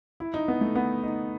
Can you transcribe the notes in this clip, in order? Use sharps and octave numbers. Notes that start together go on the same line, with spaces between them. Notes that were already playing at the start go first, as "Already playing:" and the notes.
E4
D#4
B3
A3
B3
D#4